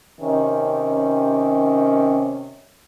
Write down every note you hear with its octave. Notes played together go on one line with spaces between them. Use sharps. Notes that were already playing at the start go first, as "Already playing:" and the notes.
C3 D#3 C#4